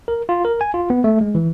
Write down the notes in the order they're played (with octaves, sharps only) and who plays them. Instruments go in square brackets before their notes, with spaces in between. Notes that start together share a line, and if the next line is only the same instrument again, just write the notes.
[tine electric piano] A#4
F4
A#4
G#5
F4
B3
A3
G#3
E3